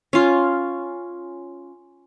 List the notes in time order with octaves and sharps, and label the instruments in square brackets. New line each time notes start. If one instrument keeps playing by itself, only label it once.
[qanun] C#4 F4